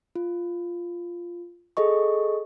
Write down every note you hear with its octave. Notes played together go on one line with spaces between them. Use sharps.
F4
G#4 A4 D#5 C#6